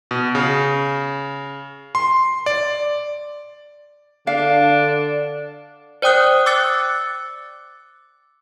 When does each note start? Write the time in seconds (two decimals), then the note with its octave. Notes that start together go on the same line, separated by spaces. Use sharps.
0.11 B2
0.35 C#3
1.95 C6
2.46 D5
4.27 D3 D4 F5
6.02 C5 D5 G5 D#6 F#6
6.46 D6 E6 F#6 A6 C#7